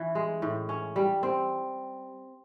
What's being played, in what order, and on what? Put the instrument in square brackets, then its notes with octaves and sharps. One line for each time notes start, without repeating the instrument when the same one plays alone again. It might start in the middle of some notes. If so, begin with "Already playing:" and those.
Already playing: [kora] E3 C#4
G#3
A2
C#4
G3
C4